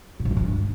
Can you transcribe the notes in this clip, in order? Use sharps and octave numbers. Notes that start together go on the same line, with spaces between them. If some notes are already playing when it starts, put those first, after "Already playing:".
A2
G#2
D3
G2